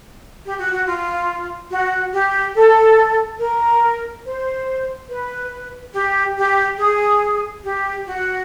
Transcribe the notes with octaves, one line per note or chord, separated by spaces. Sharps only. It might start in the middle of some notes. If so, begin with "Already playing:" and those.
G4
F#4
F#4
F4
F#4
G4
A4
A#4
C5
B4
G4
G4
G#4
G4
F#4